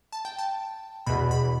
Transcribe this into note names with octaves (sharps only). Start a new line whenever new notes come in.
A5
G5
A5
E2 B2 B5
B5